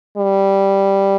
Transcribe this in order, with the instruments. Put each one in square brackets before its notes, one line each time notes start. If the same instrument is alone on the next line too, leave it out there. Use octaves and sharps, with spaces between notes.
[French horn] G3